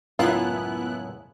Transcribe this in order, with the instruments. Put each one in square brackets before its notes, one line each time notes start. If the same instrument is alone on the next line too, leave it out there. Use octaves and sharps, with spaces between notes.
[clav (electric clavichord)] C#2 F#2 A2 [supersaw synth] B3 E4 F#6 [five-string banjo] F4